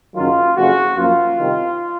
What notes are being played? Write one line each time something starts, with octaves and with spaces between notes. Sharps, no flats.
F#1 F#2 D#3 F#3 F4
F#1 F2 C#3 F#4
F#2 F3 A#3 F4
C2 C3 D#3